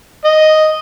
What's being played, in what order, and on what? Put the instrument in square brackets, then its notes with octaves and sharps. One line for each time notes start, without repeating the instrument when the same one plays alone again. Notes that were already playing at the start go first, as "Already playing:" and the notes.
[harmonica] D#5